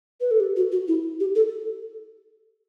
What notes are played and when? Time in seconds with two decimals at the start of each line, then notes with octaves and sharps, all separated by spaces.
0.21 B4
0.31 A4
0.40 G4
0.56 F#4
0.72 F#4
0.88 E4
1.20 G4
1.35 A4